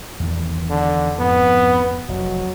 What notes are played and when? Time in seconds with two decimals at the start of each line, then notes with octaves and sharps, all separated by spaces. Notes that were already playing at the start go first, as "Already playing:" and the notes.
0.20 E2 D#3 E3
0.70 D3
1.19 F2 G#2 F3 B3
2.08 F1 F#3